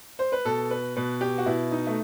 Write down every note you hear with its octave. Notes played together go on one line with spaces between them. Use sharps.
C5
B4
B2 A4
B4
B2 B4
G4
F#4
B2 E4
D#4
A3